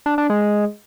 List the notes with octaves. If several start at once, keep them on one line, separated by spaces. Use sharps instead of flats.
D4
D4
G#3
G#3